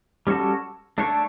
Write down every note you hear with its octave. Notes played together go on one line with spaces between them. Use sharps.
G3 C#4 F#4 A4
A3 D4 A4 C#5